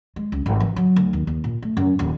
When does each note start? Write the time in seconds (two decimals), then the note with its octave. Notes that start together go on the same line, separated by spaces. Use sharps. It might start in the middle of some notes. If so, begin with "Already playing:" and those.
0.16 G#3
0.32 C#2
0.46 G#1
0.60 E3
0.76 F#3
0.96 D2
1.13 D#2
1.27 D#2
1.44 A#2
1.62 A3
1.77 F#2
1.99 D#1